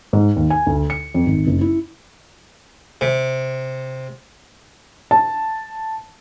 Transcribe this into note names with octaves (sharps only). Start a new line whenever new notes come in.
G#2
D#2
G#5
D2
C#7
F2
G#1
F#1
E4
C3
A5